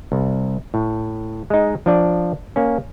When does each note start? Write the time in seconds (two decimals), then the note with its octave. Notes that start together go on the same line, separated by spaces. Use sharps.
0.12 C2
0.74 A2
1.50 G#3 D#4
1.86 F3 D4 D5
2.56 A#3 C#4